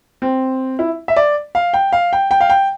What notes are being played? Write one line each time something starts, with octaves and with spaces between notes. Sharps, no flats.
C4
E4
E5
D5
F5
G5
F5
G5
G5
F5
G5